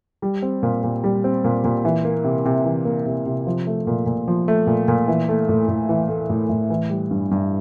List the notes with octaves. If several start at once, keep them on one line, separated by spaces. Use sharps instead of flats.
G3
C4
A#2
A#2
G3
C4
A#2
A#2
E3
A#3
C3
C3
E3
A#3
C3
C3
F3
A3
A#2
A#2
F3
A3
A#2
A#2
E3
A3
A2
A2
E3
A3
A2
A2
E3
G3
G2
G2